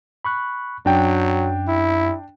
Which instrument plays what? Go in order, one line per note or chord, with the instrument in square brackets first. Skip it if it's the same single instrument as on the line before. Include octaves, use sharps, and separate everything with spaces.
[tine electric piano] B5 C#6 F#6
[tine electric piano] F#2 [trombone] F#3 [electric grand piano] D4 G5
[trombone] E4